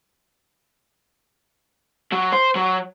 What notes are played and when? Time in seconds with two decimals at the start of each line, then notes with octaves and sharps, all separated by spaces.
2.12 F#3
2.33 C5
2.55 F#3